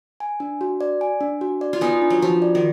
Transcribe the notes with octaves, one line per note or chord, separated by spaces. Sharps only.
G#5
D4
F#4
D5
G#5
D4
F#4
D5
F4
B3 D#4 G#5
D4
F#3
F3 F#4
D5
D#3